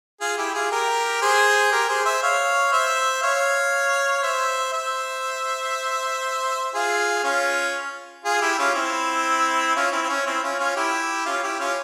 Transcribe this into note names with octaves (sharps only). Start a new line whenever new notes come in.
F4 G#4
E4 G4
F4 G#4
G4 A#4
G#4 C5
G4 A#4
G#4 C5
C5 E5
C#5 F5
C5 E5
C#5 F5
C5 E5
C5 E5
F4 G#4
C#4 F4
F4 G#4
E4 G4
C#4 F4
C4 E4
C#4 F4
C4 E4
C4
C#4
C4 E4
C#4 F4
C#4 F4
E4 G4
C#4 F4
E4 G4
C#4 F4